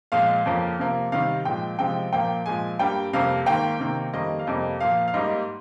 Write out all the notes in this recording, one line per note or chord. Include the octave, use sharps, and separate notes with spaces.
A#2 F3 G#3 F5
F2 C#3 F3 A#3
C3 F3 A#3
C3 D#3 G3 F5
A#2 F3 G#3 G5
C3 F3 G#3 G5
A#2 F3 A#3 G5
A#2 F3 G#3 G#5
G2 G3 A#3 G5
F2 C3 G3 A#3 F5
G#2 D#3 A#3 G5
C3 D#3 A#3
F2 D#3 G3 A#3 D#5
F5
F2 C3 G3 A#3 D#5
A#2 F3 A#3 F5
F5
G#2 G3 A#3 D#5